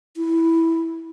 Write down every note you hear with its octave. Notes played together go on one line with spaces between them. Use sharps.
E4